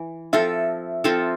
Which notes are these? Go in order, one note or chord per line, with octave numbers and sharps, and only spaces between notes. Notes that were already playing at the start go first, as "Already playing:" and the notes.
Already playing: E3
F3 C4 F4 A4 E5
F3 C4 F4 A4